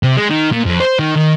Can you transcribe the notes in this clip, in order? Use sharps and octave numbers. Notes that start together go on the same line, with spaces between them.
C3
G#3
D#3
A#2
F2
C5
D#3
D#3